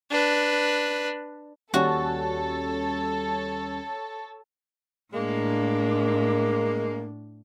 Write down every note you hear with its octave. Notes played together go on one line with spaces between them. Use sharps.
D4 B4
D#2 G3 C#4 F#4 A4 C#5
A2 G#3 A#3 D4